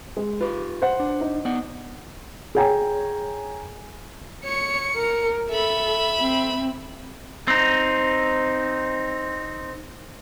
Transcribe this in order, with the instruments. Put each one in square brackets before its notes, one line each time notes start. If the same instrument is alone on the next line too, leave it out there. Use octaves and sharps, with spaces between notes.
[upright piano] G#3
[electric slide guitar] F4 G4 [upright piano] B4
[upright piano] C5 F#5
[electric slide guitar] D4
[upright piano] D#4
[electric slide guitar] B3 D5 F#5
[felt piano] G#4 C#5 G5 G#5 A#5
[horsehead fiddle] C#5 [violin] C#7
[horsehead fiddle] A#4
[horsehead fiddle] A4 [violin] E5 B5
[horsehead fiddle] C4
[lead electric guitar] C4 D#4